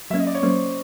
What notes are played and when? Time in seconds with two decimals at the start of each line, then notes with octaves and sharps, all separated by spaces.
0.10 F#3 A#3 C#4 E5
0.20 D#5
0.27 D5
0.35 C#5
0.43 F#3 A#3 C#4 C5